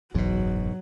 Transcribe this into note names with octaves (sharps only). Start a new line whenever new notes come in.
F#1 B1 E2 G#2 B2 F#3